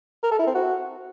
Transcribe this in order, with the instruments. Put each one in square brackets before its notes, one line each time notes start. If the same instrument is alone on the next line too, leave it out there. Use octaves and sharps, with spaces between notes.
[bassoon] A#4
A4
E4
C4
F#4